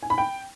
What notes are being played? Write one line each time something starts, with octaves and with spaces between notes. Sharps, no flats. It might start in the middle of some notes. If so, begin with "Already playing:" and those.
G#5
B5
G5